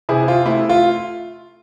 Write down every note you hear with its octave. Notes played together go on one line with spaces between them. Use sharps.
C3 E4 G#4
F4
A3 E4
F4